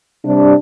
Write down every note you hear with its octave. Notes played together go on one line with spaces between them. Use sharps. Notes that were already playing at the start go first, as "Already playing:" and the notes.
C3 G3 D4